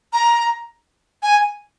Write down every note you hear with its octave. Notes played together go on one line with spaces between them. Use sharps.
A#5
G#5